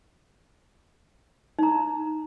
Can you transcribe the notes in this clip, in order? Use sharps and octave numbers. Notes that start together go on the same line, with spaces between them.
D#4 A#5